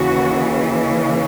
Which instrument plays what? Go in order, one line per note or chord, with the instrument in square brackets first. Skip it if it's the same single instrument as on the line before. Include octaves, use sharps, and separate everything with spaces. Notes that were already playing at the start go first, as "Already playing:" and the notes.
Already playing: [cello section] D#2 C#3 E3 F#4